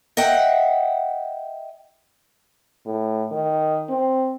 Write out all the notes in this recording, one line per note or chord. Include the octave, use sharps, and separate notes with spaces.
D#5 E5 F#5 G5
A2
D#3
C4